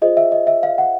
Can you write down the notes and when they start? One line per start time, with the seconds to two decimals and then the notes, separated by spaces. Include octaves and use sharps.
0.02 F4 G#4 C5 D#5
0.17 E5
0.32 D#5
0.47 E5
0.63 F5
0.78 F#5